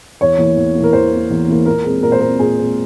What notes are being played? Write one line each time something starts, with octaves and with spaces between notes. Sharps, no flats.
E2 C#5
E3 A#3
E2
A#3
E3 A#4
E2 C5
E3 A#3
E2
E3 A#3
A#2 A#4
G#3 C4
A#2 A#4
C5
G#3 C4 A#4
A#2 G#4
G#3 C4